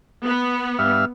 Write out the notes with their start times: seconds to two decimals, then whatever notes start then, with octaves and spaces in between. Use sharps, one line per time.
0.24 B3
0.79 G2 E5 F5